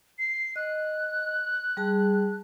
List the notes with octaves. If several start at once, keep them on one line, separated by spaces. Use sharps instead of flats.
C7
D#5 F#6
G3 G#4 A5